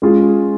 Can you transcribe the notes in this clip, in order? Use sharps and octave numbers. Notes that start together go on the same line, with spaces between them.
G#3 C#4 F4 G#4